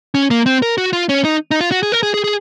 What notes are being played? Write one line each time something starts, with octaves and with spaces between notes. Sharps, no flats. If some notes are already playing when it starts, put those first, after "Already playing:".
C#4
A#3
C4
A#4
F#4
F4
C#4
D#4
D#4
F4
F#4
G#4
A#4
G#4
G#4
G#4